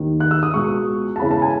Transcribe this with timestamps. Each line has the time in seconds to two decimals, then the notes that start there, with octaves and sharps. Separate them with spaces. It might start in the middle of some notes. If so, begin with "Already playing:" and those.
Already playing: D#2 D#3
0.20 F#6
0.31 E6
0.43 D#6
0.54 C#2 B2 C#6
1.16 A5
1.20 E1 E2 C#3 E3 B5
1.31 A5
1.42 G#5